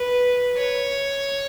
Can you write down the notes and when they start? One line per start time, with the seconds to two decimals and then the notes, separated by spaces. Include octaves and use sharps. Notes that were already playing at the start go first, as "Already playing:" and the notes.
Already playing: B4
0.57 C#5